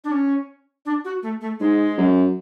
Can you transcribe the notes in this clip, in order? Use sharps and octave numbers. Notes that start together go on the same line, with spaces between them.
D4
C#4
D4
F#4
A3
A3
G#2 G#3
F#2